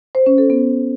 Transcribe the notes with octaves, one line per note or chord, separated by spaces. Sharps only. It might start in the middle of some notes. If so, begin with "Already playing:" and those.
C5
C#4
A4
B3